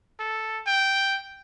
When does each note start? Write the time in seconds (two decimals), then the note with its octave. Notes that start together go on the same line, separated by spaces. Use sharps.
0.20 A4
0.67 G5